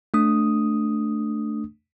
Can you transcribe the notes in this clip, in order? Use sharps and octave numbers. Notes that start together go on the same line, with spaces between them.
A3 D4 D#6